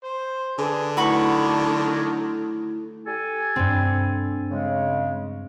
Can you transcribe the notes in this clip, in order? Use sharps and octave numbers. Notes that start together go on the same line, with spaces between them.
C5
D3 G#4 B4
D#3 F#3 A3 E4 F#4 A4 B5 C#6
G4 A4 G#5
G2 C4
C#3 G#3